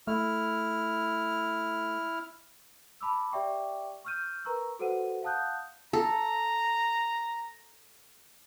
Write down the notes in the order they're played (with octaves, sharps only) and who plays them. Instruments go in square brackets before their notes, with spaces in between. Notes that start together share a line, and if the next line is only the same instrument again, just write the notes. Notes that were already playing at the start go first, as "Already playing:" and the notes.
[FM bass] A3 [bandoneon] E4 F6
[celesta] A5 B5 D6 E6
G4 D5 E5 G5 C#6 D6
C#6 E6 F6 G6 D#7
A#4 B4 A#5 C#6 E6
F#4 A4 B4 C5 F#5 D#7
F5 F#5 A5 D#6 F#6 G6
[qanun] A4 [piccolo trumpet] A#5